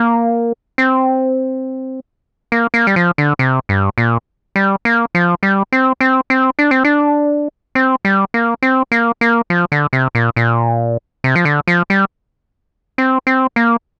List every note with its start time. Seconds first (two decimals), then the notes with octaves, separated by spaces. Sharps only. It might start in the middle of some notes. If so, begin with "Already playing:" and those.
Already playing: A#3
0.78 C4
2.52 A#3
2.74 A#3
2.87 G3
2.96 F3
3.18 D3
3.39 C3
3.69 G2
3.98 A#2
4.56 G3
4.85 A#3
5.15 F3
5.43 G3
5.72 C4
6.01 C4
6.30 C4
6.59 D4
6.71 C4
6.84 D4
7.75 C4
8.05 G3
8.34 A#3
8.62 C4
8.92 A#3
9.21 A#3
9.50 F3
9.72 D3
9.93 C3
10.15 A#2
10.36 A#2
11.24 C3
11.35 F3
11.45 D3
11.68 F3
11.90 G3
12.98 C4
13.27 C4
13.56 A#3